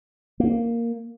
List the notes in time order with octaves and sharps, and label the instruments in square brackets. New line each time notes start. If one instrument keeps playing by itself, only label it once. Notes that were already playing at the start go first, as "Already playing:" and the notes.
[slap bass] A#3